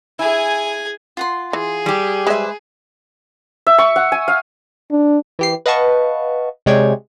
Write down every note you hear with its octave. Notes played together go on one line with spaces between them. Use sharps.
E4 G#4 G#5
F4 F#5 C6
E3 G#4
G3 G4
G#3 B4 C5 E5 G#5
E5
C#6
F#5
G#5
F5
D4
E3 G4 C7
B4 D#5 F5 F#5 A5 C#6
C3 G#3 C#5 D5 G5 G#6